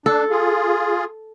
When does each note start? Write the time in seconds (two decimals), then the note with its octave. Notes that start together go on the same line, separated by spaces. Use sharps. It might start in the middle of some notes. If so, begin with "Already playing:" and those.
0.06 D4 A4
0.30 F4 G#4